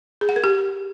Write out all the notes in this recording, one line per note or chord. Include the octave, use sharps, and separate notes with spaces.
G#4
F#5
A#4
G4